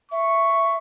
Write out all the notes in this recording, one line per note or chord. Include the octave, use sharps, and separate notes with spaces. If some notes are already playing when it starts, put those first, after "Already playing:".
E5 C#6